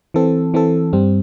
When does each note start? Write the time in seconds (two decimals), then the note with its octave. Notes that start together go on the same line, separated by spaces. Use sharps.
0.14 E3 C4 A4
0.54 E3 C4 A4
0.93 G2 G3 C4